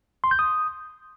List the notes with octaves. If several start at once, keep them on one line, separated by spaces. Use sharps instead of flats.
C6
G6
D#6